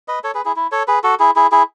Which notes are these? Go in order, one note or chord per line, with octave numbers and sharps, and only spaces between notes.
B4 D#5
A4 C#5
G#4 B4
E4 G#4
E4
A4 C#5
G#4 B4
F#4 A4
E4 G#4
E4 G#4
E4 G#4